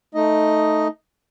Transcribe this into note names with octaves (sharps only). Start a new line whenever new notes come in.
A3 D#4 D#5